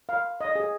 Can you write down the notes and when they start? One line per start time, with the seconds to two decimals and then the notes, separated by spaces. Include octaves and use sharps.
0.09 F5
0.41 D#5
0.55 G#4